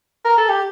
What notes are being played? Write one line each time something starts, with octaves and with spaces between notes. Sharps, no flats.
A#4
A4
G4